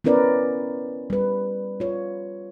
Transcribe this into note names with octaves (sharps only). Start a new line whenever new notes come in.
B3 C#4 E4 A#4 B4 D5
G3 B4
F4 C#5